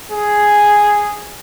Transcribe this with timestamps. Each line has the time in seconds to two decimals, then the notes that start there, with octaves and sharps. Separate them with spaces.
0.12 G#4